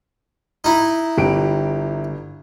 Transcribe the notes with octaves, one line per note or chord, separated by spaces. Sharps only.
D#4 E4
G1 G4 D7